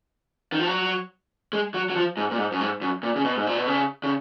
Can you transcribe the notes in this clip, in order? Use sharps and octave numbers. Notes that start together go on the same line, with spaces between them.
D#3
F3
F#3
G#3
F#3
F#3
F3
G#2
A#2
G#2
F#2
G#2
F#2
A#2
C#3
B2
G#2
A#2
B2
C#3
C#3